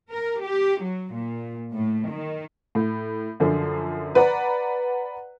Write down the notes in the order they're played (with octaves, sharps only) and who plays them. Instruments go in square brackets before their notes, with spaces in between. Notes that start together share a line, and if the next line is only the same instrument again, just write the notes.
[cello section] A#4
G4
F#3
A#2
A2
D#3
[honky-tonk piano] A2
F#2 D3 F3
B4 D5 F#5 A#5